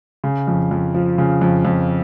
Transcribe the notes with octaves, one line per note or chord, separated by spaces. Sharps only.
C#3
F2
F2
F3
C#3
F2
F2